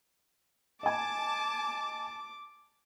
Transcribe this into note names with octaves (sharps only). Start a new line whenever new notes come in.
D#5 G#5 A5 D6